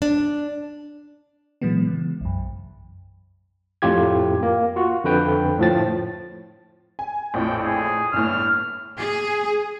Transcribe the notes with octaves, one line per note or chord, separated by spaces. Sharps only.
D4
A#2 E3 F#3 G#3 B3
C#3 E3
B1 F#2
F2 A2 F4 G4 G#6
A#3
F4 F#4
F2 D3 B4 G5
A2 F3 A6
G#5
A#1 F2 A2 G5
G#4
G1 A2 F6
G#4